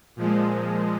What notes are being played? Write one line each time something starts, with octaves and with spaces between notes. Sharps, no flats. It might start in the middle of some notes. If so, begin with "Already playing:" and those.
A#2 F3 G#3